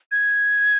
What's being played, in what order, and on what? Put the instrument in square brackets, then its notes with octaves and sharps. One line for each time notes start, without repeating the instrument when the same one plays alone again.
[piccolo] G#6